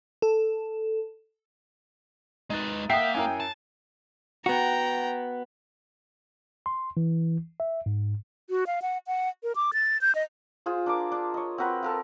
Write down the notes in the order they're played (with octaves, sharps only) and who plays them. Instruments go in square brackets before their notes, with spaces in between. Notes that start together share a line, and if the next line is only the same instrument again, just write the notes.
[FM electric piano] A4
[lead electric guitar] G#3 B4 [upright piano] D#4 A6
[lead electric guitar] A#3 [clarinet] E5 [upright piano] F#5 C7 [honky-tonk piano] G5 D#6
[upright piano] F#2 E4 A#4 [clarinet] G#5
[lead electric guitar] A5
[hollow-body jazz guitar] B3 F#4 [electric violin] G5 A#5
[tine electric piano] C6
E3
E5
G#2
[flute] F#4
F5
F#5
F#5
A#4
D6
A6
G6
D#5
[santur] F4 G#4 C5
D4 A#4 D6
D4
C#5 D#5
C4 F#4 A#4 B4
A4 A#4 F5